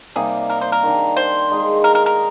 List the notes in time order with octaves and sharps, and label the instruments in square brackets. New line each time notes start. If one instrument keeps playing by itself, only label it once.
[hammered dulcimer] C3 G3 A#3 D#4 [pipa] G#4
[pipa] A#4
C5
A#4
[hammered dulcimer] D#3 A#3 D4
[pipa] C5
[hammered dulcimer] D#3 G#3 D#4 G#4
[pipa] A#4
A#4
A#4